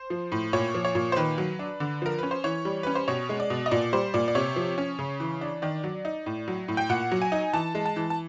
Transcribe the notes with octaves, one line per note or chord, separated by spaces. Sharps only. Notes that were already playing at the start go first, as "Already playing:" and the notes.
Already playing: C5
F3
A2
A#2 C#5
F3
C#5
A#2
C5
D#3 B4
F#3
D4
D3
F3 A#4
C#4 B4
C5
E3 C#5
G3
C#4 B4
C5
B2 C#5
G#3
D5
B2
D#5
A#2 D5
G3 C5
A#2 D5
D5
C3 C#5
F3
C#4
C#3
E3
D4
D#3 D5
F#3
D#4
A2
F#3
A2
G5
A#2 F#5
F#3
G#5
D#4
E3 A5
G#3
A5
E3
A5